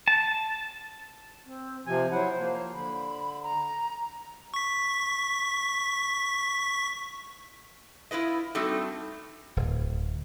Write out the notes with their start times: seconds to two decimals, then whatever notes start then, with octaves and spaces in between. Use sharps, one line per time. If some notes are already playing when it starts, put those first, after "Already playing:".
0.08 A5
1.45 C4
1.87 C3 F3 C5 G#5
2.12 F#3 E4 C5 F#5
2.39 F3 A#3
2.73 D3 B5
3.43 A#5
4.54 C#6 B6
8.11 E4 F4 B4 D#5
8.55 G3 A3 C4 D#4 F#4 A4
9.57 D1